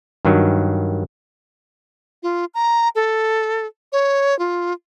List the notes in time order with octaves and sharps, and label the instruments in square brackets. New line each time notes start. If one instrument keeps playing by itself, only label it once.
[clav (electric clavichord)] G2 D#3 F#3
[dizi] F4
A#5
A4
C#5
F4